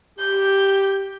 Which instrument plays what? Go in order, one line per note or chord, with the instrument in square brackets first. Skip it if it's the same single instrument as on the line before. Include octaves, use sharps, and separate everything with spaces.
[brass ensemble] G4 [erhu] G6